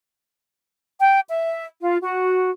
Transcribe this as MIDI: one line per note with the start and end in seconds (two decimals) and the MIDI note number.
1.00 1.19 79
1.29 1.64 76
1.81 1.97 65
2.02 2.50 66